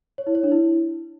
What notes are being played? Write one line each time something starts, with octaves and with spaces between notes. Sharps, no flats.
C#5
E4
C#5
D4
E4